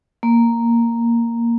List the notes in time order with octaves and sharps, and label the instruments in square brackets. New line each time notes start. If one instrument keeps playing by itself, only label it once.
[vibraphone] A#3